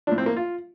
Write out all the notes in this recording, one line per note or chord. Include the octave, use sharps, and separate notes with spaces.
A2 F3 D4
C4
A#3
F4